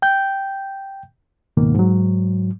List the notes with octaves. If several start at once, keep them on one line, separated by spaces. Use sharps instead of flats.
G5 G6
C#2 G#2 B2 D#3 A#3
G#2 F#3